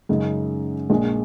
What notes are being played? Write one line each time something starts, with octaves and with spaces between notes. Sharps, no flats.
F#2 C#3 G#3 D#4
A#1 A#2 G#3